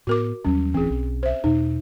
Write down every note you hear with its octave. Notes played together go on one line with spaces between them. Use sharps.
A2 B3 F#4 A#4 D6
D#2 F#3 G3 C#4
D1 E3 C4 G#4
B1
C5 E5
E2 B2 D#4